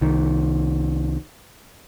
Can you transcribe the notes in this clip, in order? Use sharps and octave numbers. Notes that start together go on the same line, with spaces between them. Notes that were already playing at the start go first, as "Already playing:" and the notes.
C2 D#3